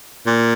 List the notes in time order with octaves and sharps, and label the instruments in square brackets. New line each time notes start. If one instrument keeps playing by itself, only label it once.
[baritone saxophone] A#2